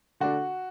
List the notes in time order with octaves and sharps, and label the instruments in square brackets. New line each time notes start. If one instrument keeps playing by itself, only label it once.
[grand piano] D3 A3 D4 F#4